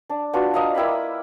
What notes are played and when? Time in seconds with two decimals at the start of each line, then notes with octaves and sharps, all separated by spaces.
0.09 D4
0.33 B3 D4 F4 F#4
0.54 D#5 F5 A#5
0.75 A#3 E4 G5 B5